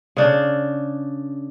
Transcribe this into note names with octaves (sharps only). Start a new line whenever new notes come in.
C#3 D4